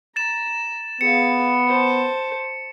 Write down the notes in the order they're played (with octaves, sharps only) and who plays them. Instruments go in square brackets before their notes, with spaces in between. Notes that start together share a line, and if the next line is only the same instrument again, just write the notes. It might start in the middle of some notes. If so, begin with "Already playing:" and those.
[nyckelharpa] A#5 [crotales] A6 E7
[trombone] B3 [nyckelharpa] G#4 F5 [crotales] C#7
[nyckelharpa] C5 A5